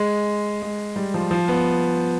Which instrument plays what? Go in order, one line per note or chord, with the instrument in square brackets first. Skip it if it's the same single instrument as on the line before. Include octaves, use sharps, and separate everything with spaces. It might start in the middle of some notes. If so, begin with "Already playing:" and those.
Already playing: [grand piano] G#3
G#3
G3
F3
F3
B3